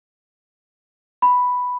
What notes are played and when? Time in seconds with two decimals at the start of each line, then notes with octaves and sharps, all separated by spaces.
1.22 B5